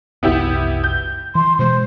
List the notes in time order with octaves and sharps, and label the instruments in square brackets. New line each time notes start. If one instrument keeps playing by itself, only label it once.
[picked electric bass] F#1 C2 [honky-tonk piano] B3 E4 G4
[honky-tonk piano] G6
[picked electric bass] E3 [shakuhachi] C6
[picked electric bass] B2 E3 G#3 [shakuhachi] C5